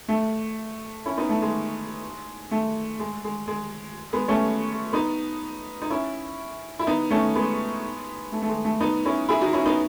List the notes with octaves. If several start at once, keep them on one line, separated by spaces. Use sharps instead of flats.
A3
C#4 E4
B3 D#4
A3
G#3
A3
G#3
G#3
G#3
G#3 B3
A3 C#4
B3 D#4
D#4
C#4 E4
E4
B3 D#4
A3 C#4
G#3 B3
A3
A3
G#3
A3
B3 D#4
C#4 E4
E4 G#4
D#4 F#4
C#4 E4
B3 D#4